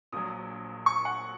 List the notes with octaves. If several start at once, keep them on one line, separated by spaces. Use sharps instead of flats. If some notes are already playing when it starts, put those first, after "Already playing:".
A#1 A#2 F#3 D#6
C#6
F#5